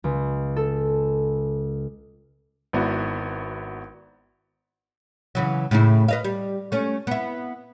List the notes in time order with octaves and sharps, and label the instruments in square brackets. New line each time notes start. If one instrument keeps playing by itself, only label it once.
[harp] C#2
A4
[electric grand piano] G#1 B3 E4 F#4
[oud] C#3 E3 F#3
A2 C#3 E4
B4 D#5 F5
G3
A3 C#4
B3 E4